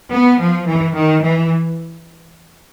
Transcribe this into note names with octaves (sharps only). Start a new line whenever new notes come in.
B3
F3
E3
D#3
E3